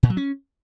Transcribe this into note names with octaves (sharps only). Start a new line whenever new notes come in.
A#2
F#3
C#4